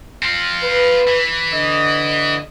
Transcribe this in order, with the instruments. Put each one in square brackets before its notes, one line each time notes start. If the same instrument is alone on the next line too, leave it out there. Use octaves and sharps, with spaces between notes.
[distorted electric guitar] C4 F4
[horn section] B4
[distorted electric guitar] E3
[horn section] D3 D#5